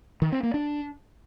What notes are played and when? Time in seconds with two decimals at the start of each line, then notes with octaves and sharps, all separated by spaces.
0.22 D#3
0.32 C4
0.43 A#3
0.54 D4